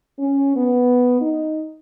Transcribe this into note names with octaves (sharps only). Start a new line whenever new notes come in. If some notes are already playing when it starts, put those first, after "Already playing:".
C#4
B3
D#4